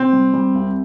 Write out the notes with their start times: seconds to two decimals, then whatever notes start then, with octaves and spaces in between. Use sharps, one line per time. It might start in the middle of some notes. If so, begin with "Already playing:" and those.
Already playing: C3 C4
0.13 G3
0.33 G3
0.55 C2